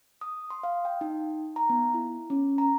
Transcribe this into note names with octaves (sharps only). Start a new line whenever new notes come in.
D#6
C6
F5
G5
D#4
A#5
B3
E4
C#4
A#5